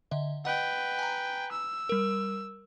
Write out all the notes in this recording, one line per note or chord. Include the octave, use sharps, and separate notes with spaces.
D3 D#5 E5
B4 D#5 F#5 G5
G#5 A#5
E6
G3 A#4